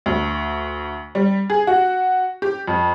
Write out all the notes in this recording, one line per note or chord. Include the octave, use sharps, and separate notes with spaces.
D2
G3
G#4
F#4
G4
F2